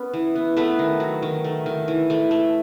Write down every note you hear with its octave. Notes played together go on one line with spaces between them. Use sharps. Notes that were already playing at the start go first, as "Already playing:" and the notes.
Already playing: B3 C#4
E3
B3
A3 B3 B4
D#3
F#3
D#3
A3
D#3
E3
A3
A3